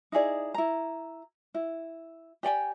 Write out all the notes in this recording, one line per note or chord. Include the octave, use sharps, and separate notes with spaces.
D#4 E4 G#4 D5
E4 A#5
E4
G4 D5 G5 G#5